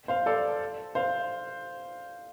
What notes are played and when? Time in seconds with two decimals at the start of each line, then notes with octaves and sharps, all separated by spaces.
0.08 C5 F5
0.26 A4 D5
0.95 C5 F5